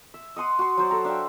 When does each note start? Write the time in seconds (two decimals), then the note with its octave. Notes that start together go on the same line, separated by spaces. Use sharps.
0.14 E5
0.36 D#5 F#5 C6 D#6
0.59 F#4 C6
0.77 F#3 C5 D5
0.91 A4 A#5
1.05 D4 E5 F5 G5